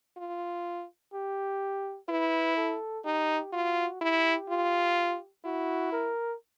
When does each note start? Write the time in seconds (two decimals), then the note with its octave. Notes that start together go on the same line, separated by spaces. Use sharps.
0.17 F4
1.13 G4
2.09 E4 B4
2.57 A4
3.05 D#4 G4
3.53 F4 F#4
4.01 E4 G4
4.50 F4
5.45 E4 F#4
5.92 A#4